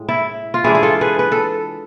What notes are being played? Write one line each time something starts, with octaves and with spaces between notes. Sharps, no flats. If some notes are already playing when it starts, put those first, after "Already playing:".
Already playing: A2 G#3
E4
F4
E3 G#3 D4 E4 G#4
G#4
F4 A4
G#4 B4
B4
A4